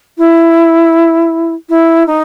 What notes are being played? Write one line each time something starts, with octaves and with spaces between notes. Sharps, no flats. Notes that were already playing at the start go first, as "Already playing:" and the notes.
E4
E4
D#4